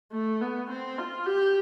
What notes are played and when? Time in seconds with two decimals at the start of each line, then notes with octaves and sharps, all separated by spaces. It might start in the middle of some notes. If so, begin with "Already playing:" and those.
0.12 A3
0.41 B3
0.70 C4
0.98 F4
1.26 G4